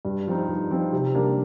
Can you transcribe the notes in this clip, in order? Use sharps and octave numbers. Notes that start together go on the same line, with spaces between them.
G2
F3 C4 D#4
G2
F3 C4 D#4
C3
G3 A#3 D4